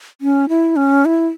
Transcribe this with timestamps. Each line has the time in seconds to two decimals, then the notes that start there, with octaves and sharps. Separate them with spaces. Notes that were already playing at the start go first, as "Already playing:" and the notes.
0.21 C#4
0.49 E4
0.76 C#4
1.05 E4